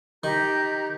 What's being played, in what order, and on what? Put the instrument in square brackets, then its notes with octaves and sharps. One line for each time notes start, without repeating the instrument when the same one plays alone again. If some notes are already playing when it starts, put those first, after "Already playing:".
[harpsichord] D#3 [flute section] G4 A#5 G6